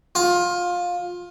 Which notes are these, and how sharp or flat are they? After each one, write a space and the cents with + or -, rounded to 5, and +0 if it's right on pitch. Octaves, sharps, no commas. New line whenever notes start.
F4 +20